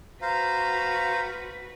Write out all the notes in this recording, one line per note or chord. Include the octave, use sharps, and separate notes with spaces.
F#4 B4 C5 F5 A#5